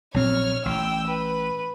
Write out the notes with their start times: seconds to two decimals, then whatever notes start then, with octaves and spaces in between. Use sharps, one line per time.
0.14 A#1 F#3 C4 C#5 F6
0.65 A1 G5 E6
1.07 B4